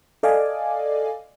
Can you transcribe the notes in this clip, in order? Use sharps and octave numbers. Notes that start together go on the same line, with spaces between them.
A4 D5 D#5 F5 G#5 D6